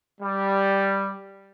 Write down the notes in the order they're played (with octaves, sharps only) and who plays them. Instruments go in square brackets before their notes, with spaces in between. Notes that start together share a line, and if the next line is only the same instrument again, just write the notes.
[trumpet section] G3